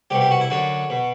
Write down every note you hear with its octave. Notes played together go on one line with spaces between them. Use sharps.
C2 B2 G4
G4
F#4
E4
F#2 D3 F#4
B2